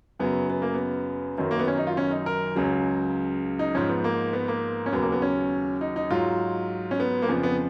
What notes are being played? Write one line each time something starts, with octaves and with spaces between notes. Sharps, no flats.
F#2 C#3 F#3 B3
B3
A#3
B3
F#2 D#3 F#3
A#3
B3
C#4
D#4
F4
C#4
D#4
A#4
C#2 C#3 F#3
D#4
G#2 F3 C#4
B3
A#3
B3
A#3
C#4
D#2 C#3 F#3 B3
A#3
B3
C#4
D#4
D#4
G#2 F#3 F4
C#4
B3
A#3
F2 C#3 F3 B3
B3